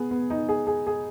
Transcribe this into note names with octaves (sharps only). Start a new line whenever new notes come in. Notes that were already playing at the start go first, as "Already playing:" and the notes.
Already playing: B3 G#4
B3
D#4
G#4
G#4
G#4